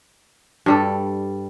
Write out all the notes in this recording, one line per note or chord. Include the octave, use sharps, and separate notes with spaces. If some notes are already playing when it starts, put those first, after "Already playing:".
G2 G3 A4